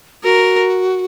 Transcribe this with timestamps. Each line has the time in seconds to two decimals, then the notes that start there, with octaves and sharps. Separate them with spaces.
0.23 F#4 A#4